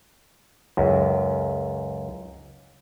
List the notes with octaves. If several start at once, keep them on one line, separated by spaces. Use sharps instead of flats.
C#2 F#2